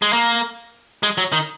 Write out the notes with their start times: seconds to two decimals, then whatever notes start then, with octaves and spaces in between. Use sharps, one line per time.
0.02 G#3
0.13 A#3
1.03 G#3
1.18 F#3
1.32 D#3